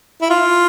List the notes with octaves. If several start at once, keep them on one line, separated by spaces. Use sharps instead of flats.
E4
F4